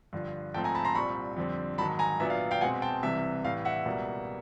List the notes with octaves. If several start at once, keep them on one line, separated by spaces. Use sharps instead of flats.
G2 D3 F3
G#2 F3 A3 C4 G5 A5
G#5 A#5
A5 B5
A#5 C6
C2 A#2 G3 C4 B5 C#6
F2 D3 G3 C4
G#2 D#3 F#3 A5 B5
G#5 A#5
A#2 F#3 B3 D4 E5
F5
F5 G5
B2 G#3 C4 F#5 G#5
G5 A5
C2 C3 E3 E5
A2 E3 G3 F5
E5 F#5
C#2 B2 G3 A#3